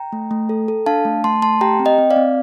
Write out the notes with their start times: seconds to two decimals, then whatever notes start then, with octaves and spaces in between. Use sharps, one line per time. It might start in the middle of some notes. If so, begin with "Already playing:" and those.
Already playing: G5 A#5
0.13 A3
0.31 A3
0.49 A4
0.68 A4
0.86 D4 F5 A5
1.05 A3
1.24 A3 A5 C6
1.42 A3 A5 C6
1.61 G4 G5 A#5
1.80 C4
1.85 D#5 G5
1.98 C4
2.10 D5 F5
2.16 C4